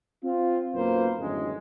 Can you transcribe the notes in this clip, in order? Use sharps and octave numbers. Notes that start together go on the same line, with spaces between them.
C4 F4
B1 F#2 A#3 F4 B4 C5
G1 F#2 A2 D#3 E3 G#3